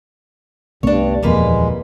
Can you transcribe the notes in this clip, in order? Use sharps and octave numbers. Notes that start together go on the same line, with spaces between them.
C2 G2 A3 B3 D4 C#5
D#1 F2 E3 G3 G#3 A#3 B4